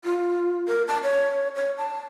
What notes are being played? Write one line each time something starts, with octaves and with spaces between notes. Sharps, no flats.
F4
A#4
A5
C#5
C#5
A5